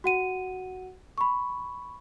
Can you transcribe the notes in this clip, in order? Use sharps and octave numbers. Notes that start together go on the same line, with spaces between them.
F#4 F#5 D#7
B5 C#6